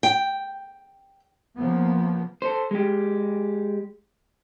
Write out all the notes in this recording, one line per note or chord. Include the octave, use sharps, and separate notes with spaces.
G5
C#3 F3 A#3 B3
A4 C5
G#3 G4